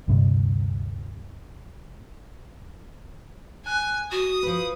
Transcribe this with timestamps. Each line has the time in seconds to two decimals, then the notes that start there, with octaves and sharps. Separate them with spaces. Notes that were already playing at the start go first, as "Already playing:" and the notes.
0.08 D2 G2 C3 G3
3.66 G#5 F#6
4.11 F#4 D#6
4.43 F3 B4